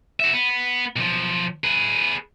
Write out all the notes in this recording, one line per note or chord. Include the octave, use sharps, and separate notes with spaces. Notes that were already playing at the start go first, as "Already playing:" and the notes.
F#4 E5
B3
B1 F3
G#4 B4